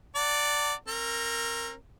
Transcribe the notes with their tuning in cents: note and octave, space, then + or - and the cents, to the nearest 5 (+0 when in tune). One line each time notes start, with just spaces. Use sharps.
D5 -5 F#5 +0 A5 +45
C4 +40 A#4 -5